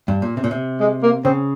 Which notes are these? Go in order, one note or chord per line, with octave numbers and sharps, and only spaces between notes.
G2
A#2
C3
A#2
C3
G#3
A#3
C#3 C4